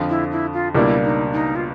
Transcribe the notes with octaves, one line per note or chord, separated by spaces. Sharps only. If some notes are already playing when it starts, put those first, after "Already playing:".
Already playing: F2 D3 F3
E4
E4
F4
C#2 B2 G3 A#3 D4 E4
D#4
D#4
F4